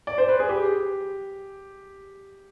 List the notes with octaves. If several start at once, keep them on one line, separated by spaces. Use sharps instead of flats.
D5
C5
B4
G#4
G4